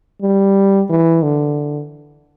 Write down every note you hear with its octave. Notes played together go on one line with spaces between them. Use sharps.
G3
E3
D3